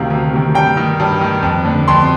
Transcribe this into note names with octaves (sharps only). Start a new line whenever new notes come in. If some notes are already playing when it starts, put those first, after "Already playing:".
Already playing: D2 C3 D#3 F5
D2
C3 D#3
G2 G5
D#3
G2
D#3
F2
D3
F2 C6